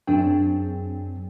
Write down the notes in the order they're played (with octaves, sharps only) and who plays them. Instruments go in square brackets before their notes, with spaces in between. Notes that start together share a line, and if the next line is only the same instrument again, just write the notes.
[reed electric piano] F#2 C4 G5 [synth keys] F#3 D4 G#4